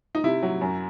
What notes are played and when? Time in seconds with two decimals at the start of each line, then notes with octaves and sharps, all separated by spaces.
0.15 D#4
0.24 C3 E4
0.43 F#3
0.61 F#2